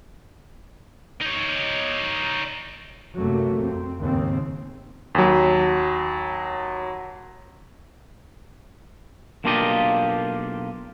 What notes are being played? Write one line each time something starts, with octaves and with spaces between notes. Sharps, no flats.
D#4 C#5
F#2 C3 F#3 A3 A#3
F2 C4
D#2 G#2 C#3 C4
D#2 F#3
B1 A#3 D4 F4 G4 D#5